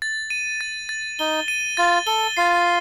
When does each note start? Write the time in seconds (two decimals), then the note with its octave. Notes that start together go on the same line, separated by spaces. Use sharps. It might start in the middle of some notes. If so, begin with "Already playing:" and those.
0.02 A6
0.30 D#7
0.61 A6
0.89 A6
1.19 D#4 G7
1.48 D#7
1.77 F4 A6
2.07 A4 G7
2.37 F4 C7